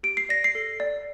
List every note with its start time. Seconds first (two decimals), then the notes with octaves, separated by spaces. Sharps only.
0.03 G4 D7
0.17 C7
0.29 D5 A#6
0.44 C7
0.55 A4
0.80 D5